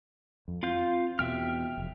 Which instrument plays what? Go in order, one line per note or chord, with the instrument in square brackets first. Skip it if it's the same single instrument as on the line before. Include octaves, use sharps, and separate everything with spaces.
[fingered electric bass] F2
[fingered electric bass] C4 [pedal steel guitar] F4 F5 G6
[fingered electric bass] E2 B2 [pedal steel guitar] E5 G5 F6
[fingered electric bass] F1